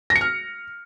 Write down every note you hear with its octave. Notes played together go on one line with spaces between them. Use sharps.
A#6
C#7
F6